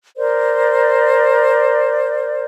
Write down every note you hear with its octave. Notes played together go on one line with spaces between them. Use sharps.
A#4 C5 D5